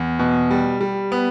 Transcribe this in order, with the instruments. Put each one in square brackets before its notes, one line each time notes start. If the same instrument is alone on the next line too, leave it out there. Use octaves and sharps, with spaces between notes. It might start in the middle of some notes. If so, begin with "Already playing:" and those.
Already playing: [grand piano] E2
B2
G3
G3
B3